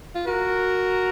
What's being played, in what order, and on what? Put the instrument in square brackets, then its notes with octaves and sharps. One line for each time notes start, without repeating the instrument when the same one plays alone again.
[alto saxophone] F4
[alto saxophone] F#4 [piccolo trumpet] A#4